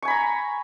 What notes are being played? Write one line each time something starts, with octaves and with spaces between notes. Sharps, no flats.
G#5 A#5 B5 C#6